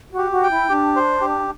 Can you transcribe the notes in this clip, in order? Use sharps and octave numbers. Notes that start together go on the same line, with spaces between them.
F#4
G4
F#4
G5
E4
D4 G4
C5
G4